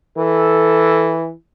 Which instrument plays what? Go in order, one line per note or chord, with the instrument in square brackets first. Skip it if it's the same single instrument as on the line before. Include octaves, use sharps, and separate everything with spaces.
[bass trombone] E3 [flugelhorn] A4